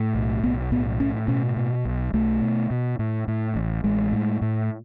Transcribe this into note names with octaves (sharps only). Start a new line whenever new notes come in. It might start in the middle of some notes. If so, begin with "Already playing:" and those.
Already playing: A2
B1
B1 B3
A2 B3
A2 C#4
B2 C#4
B2
B1
B1 A3
B2
B2
A2
A2
A1
A1 G#3
A2
A2